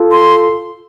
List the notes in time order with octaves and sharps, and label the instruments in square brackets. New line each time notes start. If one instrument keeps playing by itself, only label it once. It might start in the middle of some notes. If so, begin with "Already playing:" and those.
Already playing: [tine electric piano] F4 A4
[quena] C6